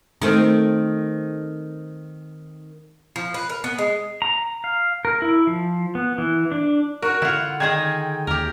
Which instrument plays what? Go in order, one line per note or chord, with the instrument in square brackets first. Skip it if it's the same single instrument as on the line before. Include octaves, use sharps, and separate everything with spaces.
[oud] D#3 A3 C4
[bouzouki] F3
B4
A#4
B3
G#3
[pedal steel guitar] A#5
F5
A#4
E4
F3
B3
E3
D4
[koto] F#4 [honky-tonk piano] A#4
[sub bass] D3 [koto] E4 F4 [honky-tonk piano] F#5
[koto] D#3 G#4 D#5 [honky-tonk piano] G5 G#6
[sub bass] D#2 [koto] G4 A#4